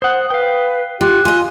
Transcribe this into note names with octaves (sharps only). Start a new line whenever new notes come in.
C5 F#5 D#6
B4 F5 G5
F4 G4 F#6
F4 D#5 G#5